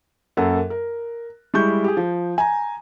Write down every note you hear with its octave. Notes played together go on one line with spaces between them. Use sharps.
F#2 A#3 A4 F#5
A#4
G3 G#3 E4 C#6 G6
G4 G#4
F3
G#5 A#5